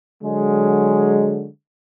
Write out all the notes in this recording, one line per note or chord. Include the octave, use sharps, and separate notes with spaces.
D3 F#3 G#3